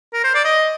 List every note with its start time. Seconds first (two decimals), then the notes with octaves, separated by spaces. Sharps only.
0.13 A#4
0.24 C5
0.35 D5
0.45 D#5